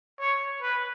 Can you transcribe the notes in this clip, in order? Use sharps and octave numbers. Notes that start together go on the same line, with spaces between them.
C#5
B4